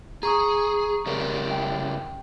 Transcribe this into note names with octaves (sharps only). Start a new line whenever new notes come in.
G#4 A#5 C#6 D#6
C#3 G3 A#4
G5